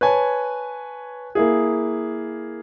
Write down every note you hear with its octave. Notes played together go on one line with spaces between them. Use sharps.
B4 C#5 G#5 A5
A#3 E4 G#4